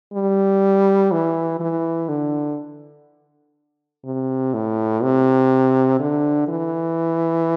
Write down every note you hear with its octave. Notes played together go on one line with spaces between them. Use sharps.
G3
E3
E3
D3
C3
A2
C3
D3
E3